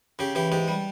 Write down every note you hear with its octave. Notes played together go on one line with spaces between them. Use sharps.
C#3 G4
E3 G4
G#2 G4
G3